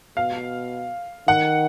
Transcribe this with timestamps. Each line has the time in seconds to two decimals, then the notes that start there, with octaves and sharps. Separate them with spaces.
0.17 B2 F5
1.28 D#3 F#5